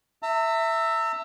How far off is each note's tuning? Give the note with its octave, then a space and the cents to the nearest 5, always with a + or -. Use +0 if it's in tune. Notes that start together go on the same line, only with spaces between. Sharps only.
E5 +0 A#5 -45